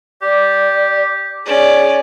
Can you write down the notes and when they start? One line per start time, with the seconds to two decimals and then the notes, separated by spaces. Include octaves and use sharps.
0.22 G4 D5
1.45 C#4 G#4 D5